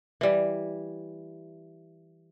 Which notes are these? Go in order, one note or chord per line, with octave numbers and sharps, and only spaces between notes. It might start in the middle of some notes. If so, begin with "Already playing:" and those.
E3 G3